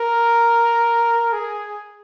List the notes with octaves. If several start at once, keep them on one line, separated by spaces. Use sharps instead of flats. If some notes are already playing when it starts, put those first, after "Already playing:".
Already playing: A#4
G#4